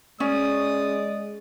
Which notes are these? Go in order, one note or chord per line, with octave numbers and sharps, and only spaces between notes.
G#3 C#4 D5 D#6